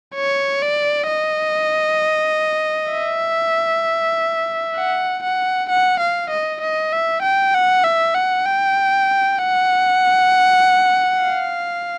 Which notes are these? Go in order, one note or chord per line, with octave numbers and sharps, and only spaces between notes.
C#5
D5
D#5
E5
F#5
F#5
F#5
F5
D#5
D#5
E5
G5
F#5
E5
F#5
G5
F#5
F5